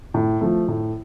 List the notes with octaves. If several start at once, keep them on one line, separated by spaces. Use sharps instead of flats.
A2
F3 A3
A2